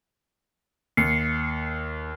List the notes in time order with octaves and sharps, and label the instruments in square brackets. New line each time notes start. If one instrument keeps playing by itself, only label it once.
[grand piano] D#2 [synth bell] C7 C#7